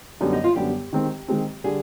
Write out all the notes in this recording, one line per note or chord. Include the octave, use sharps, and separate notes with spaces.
F#2 D3 G3 B3 D#4
D#4
F4
F#2 D3 G3 B3 G4
D#3 G#3 C4
D#3 G#3 C4
D3 G3 G#4